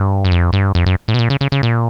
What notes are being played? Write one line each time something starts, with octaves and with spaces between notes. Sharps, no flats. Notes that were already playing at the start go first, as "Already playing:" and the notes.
Already playing: G2
F#2
F2
G2
F2
F#2
A2
B2
A#2
C#3
C#3
C#3
A#2